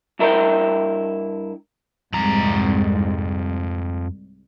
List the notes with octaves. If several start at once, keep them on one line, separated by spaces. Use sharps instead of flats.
G2 E4 A#4 B4 G5
C2 F2 G#2 A#5